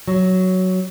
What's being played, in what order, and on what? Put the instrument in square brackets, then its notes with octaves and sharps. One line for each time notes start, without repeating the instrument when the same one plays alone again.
[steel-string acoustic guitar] F#3